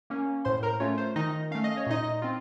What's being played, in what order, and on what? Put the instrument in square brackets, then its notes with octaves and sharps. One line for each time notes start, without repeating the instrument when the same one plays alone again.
[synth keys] A#3 C#4
A2 C5 C6
A#4 A#5
A3 C#4 F4 C#5
C5
D#3 D#4 D#5
A3 C#4 F5
D#5
C#5
A#2 D#4 D#5
C4 F4